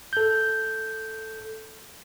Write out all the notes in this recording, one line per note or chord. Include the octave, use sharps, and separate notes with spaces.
A4 G6